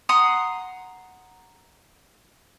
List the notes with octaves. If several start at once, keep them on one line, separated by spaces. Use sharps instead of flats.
F#5 A#5 C6 D#6